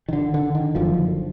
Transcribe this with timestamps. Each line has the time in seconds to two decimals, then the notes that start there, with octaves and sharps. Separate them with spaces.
0.08 D#3
0.13 D3
0.34 D3
0.55 D#3
0.75 F#1 F#2 D3 F3